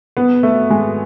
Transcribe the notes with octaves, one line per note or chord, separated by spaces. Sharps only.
B3
A3
G#3